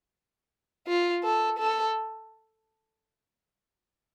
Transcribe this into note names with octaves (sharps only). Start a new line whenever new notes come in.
F4
A4
A4